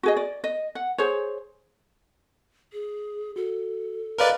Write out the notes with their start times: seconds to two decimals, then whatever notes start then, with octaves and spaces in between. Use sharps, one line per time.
0.03 F#4 G#4 D#5
0.17 D5
0.44 D#5
0.75 F#5
0.98 G#4 C5 C#5
2.73 G#4
3.36 F#4 A4
4.18 A#4 B4 D5 D#5 F5 F6